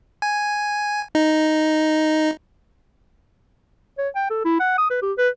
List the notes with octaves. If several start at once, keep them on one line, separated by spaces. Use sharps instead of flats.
G#5
D#4
C#5
G5
A4
E4
F#5
D#6
B4
G4
B4